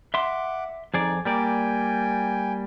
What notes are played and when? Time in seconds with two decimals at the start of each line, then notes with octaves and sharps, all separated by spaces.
0.14 E5 F#5 C6 D6
0.94 F2 D#4 G#4 D5
1.25 G3 A#3 D5 G5 G#5